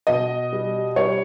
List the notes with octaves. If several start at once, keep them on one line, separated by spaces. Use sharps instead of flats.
B2 D#5
G3
G3 C#5